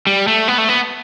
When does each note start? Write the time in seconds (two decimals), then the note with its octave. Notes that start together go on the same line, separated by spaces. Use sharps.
0.07 G3
0.27 A3
0.48 B3
0.58 A3
0.69 B3